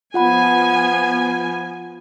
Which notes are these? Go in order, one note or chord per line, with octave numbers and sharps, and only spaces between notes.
F3 B3 F4 F#5 G#5 B5